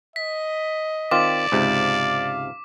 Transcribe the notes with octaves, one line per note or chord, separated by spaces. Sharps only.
D#5 B6
D#3 C4 F4 D5 D6
C#2 G#2 C3 F5